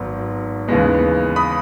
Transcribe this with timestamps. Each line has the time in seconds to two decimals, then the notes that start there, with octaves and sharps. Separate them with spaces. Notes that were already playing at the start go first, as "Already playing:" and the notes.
Already playing: G#1 G#2 F#3 B3
0.68 D#2 C#3 E3 G#3 B3
1.36 B5 D#6